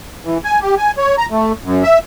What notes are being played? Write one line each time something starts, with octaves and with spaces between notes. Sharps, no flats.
E3
G#5
G4
G#5
C#5
A#5
A3
F#2
E5